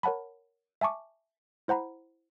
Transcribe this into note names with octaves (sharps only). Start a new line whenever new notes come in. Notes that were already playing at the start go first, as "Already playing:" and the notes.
A#4 C#5 F#5 A5 B5
E5 G#5 A5 C#6 D6
E4 C5 F#5 A#5 B5